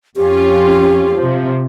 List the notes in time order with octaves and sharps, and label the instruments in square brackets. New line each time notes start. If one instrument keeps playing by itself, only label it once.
[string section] F2 C#4 F4 [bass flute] G4
[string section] C3 F3